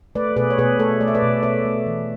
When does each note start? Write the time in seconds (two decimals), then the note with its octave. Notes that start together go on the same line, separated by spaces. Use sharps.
0.15 A3 B4 D5
0.36 B2 G#4 B4
0.50 C#5
0.58 B2 G#4 B4
0.79 A3 A4 C#5
1.01 A3 D5
1.08 E5
1.15 B4 D5
1.22 B2
1.43 B2 C#5 E5
1.65 A3
1.86 E3